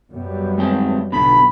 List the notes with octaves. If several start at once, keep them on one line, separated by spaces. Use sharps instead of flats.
F#2 G3 B3
G#3 C4 G5
B1 D3 B3 B5